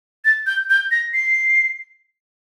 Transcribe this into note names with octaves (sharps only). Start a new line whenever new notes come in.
A6
G6
G6
A#6
C7